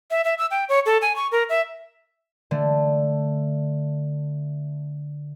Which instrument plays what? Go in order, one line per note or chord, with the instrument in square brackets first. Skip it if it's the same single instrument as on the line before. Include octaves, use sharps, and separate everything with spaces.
[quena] E5
E5
E6
G5
C#5
A4
G#5
C#6
A#4
E5
[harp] D3 A3